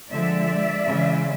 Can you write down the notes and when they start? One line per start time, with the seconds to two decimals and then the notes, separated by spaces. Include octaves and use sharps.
0.11 D3 F3 G#3 D5 E5
0.86 C#3 E3 G#3